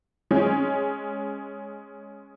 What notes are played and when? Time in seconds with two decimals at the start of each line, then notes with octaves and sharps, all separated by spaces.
0.31 G#3 C#4